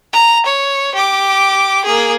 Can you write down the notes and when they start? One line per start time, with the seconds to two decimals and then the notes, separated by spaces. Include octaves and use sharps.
0.13 A#5
0.46 C#5
0.94 G4 D6
1.85 A#3 G#4